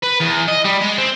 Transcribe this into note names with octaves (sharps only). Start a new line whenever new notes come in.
B4
E2
D#5
G3
G#3
C4